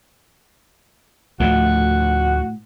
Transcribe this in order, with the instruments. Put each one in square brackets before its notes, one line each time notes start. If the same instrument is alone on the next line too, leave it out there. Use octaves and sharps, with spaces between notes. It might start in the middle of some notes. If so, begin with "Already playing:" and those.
[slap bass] D2 F3 [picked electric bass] A2 [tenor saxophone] F#4